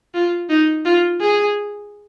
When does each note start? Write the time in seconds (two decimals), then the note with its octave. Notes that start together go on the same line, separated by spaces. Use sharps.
0.14 F4
0.49 D#4
0.85 F4
1.21 G#4